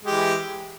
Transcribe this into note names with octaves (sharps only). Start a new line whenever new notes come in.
E3 G#3 G4